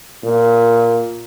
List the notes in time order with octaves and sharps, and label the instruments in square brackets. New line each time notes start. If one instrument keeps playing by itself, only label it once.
[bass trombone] A#2